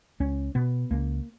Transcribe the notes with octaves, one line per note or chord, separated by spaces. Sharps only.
C#2 C#4
B2 B3
C#2 A#3